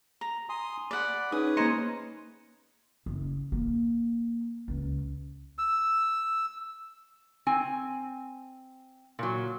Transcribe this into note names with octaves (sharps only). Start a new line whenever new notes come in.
A#5
G#5 C6 D#6
D5 F#5 B5
C#4 D#4 G#4 B4 D#6
A#3 C5 D#5 A#5 G#6 C#7
F#1
A#3
C#2
E6
C4 G#5
A#2 F#3